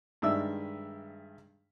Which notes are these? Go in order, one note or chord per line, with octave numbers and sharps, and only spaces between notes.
G2 D#3 G#3 D5 E5 E6